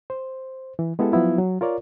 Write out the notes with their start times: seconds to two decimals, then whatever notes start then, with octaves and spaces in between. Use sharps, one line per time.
0.10 C5
0.79 E3
0.99 G#3 B3 E4 G4 A4
1.12 F3 F#3 B3 E4 F4
1.39 F#3
1.61 F4 A#4 C#5 D5